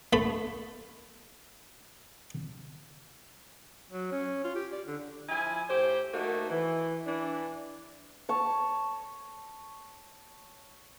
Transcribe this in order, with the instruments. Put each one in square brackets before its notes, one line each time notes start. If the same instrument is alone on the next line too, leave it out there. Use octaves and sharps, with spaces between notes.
[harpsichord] A3 B5
[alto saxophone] F#3
C#4
F4
G4
D5
D3
[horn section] F3 E4 G#5
A2 G4 C5
A3 A#3 D#4 F#4
E3
E3 D4
[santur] C#5 A5